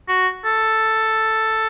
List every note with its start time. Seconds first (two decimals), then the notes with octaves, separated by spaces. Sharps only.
0.09 F#4
0.45 A4